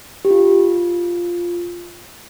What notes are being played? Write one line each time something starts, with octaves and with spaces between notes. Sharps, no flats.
G4
F4